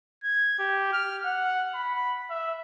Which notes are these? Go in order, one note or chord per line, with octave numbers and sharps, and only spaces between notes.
G#6
G4
F6
F#5
B5
E5